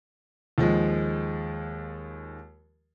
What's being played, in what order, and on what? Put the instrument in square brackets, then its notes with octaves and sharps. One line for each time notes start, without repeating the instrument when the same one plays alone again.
[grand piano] D#2 F3 G#3